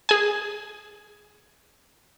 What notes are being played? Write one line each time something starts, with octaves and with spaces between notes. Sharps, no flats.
G#4 G#5